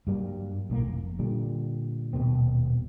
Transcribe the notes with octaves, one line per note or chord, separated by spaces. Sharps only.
G2 F#3 G3 A#3
B1 A2 G3 A#3
F1
A#2 D3 G3
D#1 B2 A#3 C4